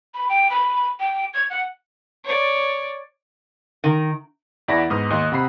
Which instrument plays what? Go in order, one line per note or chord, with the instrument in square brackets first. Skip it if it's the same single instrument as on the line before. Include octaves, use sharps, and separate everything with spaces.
[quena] B5
G5
B5
G5
G#6
F#5
[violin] C#5 D5
[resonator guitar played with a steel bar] D#3
[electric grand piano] E2 E4 D5 F#5 B5 A#6
G#2 B3 D#6 F6
D#2 D#5 C6 F#6
C3 F#5 B5 C7